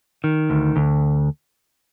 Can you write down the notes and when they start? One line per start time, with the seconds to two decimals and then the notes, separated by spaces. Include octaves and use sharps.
0.24 D#3
0.50 D2
0.76 D2